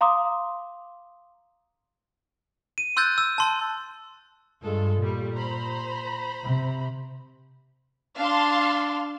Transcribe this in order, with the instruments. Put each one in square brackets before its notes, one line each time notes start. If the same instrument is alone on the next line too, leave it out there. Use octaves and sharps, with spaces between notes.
[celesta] F5 A#5 C6 D6 D#6
[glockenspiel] D#7
C6 E6 F#6 G6 A6
E6
A5 C6
[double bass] G2 [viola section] G#3 F4 A4
[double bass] A#2 [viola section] G3 A3
[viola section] C5 A#5 B5
[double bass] C3
[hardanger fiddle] D4 [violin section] F5 A5 C6